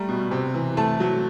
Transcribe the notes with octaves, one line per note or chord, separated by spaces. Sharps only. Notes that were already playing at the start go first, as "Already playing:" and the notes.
Already playing: G3 A3 A#5
B2
C3
E3
A3 A5
F#3